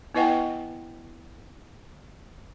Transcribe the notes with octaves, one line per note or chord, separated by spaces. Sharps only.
B3 E4 B4 D#5 F#5 G5